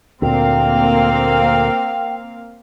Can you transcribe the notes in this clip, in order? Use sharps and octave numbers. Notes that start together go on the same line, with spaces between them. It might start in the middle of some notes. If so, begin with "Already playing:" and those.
D2 A#2 A#3 C4 F5 G5